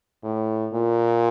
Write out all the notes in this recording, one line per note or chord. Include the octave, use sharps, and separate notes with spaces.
A2
A#2